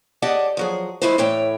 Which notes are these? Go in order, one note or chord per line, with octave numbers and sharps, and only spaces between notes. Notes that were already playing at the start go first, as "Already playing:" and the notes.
G4 G#4 D5 D#5 F#5 A5
F3 F#3 G#4
F3 G#3 A3 E4 B4 C5
A2 E3 A3 C#5 G5